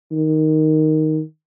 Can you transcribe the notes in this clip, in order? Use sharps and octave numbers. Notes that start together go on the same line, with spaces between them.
D#3